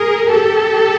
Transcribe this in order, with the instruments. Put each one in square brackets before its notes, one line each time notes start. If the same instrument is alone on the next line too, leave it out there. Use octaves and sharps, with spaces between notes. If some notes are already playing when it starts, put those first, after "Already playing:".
Already playing: [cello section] G#4 A#4
G4 A4